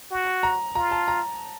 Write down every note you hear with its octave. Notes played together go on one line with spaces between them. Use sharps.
F#4
A#5
F4 A#5
A5
A#5